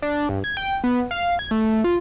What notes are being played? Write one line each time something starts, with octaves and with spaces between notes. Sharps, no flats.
D4
G2
G#6
G5
B3
F5
G#6
A3
F4